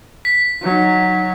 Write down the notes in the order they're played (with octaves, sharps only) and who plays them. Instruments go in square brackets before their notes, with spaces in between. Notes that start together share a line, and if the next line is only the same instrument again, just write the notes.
[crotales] B6
[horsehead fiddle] F#3 D#4